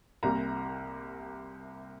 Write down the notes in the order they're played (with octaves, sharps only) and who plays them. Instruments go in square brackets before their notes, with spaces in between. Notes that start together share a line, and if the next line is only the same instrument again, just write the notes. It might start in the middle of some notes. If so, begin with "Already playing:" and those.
[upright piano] C2 C3 G3 A#3 A#5